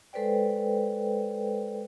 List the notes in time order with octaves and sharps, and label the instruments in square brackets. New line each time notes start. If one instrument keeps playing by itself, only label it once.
[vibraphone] G#3 A4 B4 C5 D5 G5